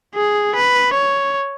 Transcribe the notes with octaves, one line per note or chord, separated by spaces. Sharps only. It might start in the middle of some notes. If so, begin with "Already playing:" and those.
G#4
B4
C#5